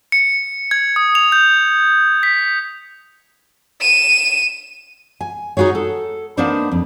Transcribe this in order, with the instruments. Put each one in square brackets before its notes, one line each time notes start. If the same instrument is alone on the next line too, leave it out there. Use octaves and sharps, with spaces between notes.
[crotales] C#7
G#6
D#6
F7
G6
B6
[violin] D#7 E7
[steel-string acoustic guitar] G#5
D#4 F4 F#4 G#4 C#5
A4
A#3 B3 D4 D#4 C5 D5
F2